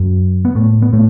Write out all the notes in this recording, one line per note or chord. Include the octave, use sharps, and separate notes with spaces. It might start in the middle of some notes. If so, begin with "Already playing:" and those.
Already playing: F#2 F#3
B3
A2 A3
B3
A2 A3